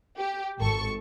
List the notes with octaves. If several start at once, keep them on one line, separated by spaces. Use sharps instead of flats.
G4
G#1 A4 C#6